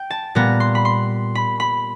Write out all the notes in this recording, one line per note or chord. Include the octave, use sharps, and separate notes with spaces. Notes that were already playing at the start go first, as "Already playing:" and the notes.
Already playing: G5
A5
A#2 G3 B3 A#5
C6
B5
C6
B5
B5